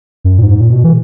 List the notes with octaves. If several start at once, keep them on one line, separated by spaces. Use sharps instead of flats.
F#2
A#2
G#2
A#2
B2
E3